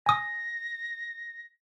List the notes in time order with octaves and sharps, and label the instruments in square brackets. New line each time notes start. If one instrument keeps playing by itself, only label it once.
[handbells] G#5 D#6 [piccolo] A#6